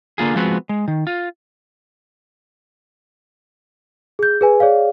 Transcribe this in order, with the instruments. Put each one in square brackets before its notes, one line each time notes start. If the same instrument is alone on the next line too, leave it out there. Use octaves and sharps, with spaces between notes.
[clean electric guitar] D3 A#3 F4 G#4
F3 G#3 B3 C4 F#4
G#3
D#3
F4
[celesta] G#4 G6
G#4 B4 G#5
G#4 C#5 D5 F5